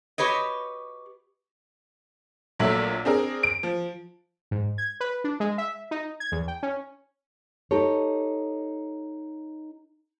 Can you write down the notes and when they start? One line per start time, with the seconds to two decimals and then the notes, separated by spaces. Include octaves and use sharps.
0.18 F#4 G4 B4 C#5 D#5
2.59 A#1 A#2 F#3 A3 E5 F#7
3.05 C4 D4 G#4 A#4
3.43 D7
3.63 F3
4.51 G#2
4.78 G#6
5.00 B4
5.24 D4
5.40 G#3
5.58 E5
5.91 D#4
6.20 G#6
6.32 E2
6.48 G5
6.63 C#4
7.71 D#4 G4 A4 C#5